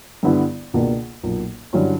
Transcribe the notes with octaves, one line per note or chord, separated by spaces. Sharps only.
G2 D3 G3 B3 E4
C#2 B2 A#3 D4
B1 A#2 A#3
G2 D3 F#3 C#4 E4